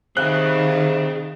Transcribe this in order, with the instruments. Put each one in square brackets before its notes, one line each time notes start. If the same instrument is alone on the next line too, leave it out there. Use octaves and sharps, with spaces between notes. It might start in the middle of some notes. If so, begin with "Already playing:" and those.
[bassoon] C3 [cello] D#3 [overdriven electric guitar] G#4 F5 [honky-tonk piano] F#6